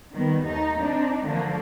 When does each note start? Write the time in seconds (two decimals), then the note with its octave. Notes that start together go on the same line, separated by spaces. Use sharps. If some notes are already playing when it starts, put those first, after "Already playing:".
0.13 D#3 G3 B3
0.44 D#2 A3 D#4
0.81 C4 D4 D#4
1.24 D3 F3 A3 A#3